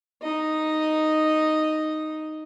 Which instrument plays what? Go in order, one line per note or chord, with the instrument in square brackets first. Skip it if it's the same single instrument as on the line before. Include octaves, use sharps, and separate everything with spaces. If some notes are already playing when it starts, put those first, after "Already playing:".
[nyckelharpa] D#4 D#5